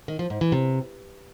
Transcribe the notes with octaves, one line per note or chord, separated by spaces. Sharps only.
D#3
F3
G#2
E3
C3